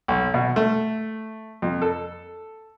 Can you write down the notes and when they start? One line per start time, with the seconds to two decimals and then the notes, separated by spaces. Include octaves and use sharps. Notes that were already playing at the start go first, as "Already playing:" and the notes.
0.08 B1
0.34 B2
0.56 A3
1.62 F2
1.82 A4